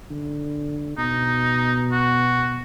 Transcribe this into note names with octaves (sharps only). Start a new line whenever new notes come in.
D3
B2 D#4
F#4